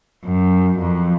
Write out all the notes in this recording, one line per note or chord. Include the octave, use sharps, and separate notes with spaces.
F#2
F2